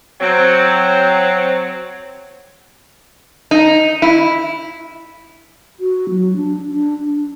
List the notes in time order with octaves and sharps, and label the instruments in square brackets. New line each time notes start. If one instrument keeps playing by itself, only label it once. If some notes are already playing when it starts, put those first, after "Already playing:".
[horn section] F#3 C4
[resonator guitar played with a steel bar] D#4
E4
[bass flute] F#4
F#3
D4
D4
D4